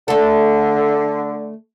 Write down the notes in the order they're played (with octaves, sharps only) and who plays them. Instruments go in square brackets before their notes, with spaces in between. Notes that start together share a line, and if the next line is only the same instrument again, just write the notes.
[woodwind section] D3 [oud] A3 A4